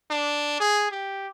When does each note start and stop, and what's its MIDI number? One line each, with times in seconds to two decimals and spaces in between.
0.11 0.58 62
0.60 0.88 68
0.91 1.28 67